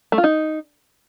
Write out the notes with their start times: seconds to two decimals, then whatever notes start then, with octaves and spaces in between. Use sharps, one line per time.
0.12 A3
0.18 F4
0.24 D#4